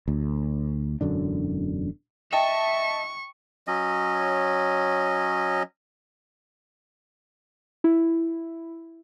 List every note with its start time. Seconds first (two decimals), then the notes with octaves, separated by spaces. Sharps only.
0.08 D2
1.01 E1 F#2 D3 D4
2.33 D#5 E5 G5 A5 C#6
3.67 F#3 C#4 D#5
7.84 E4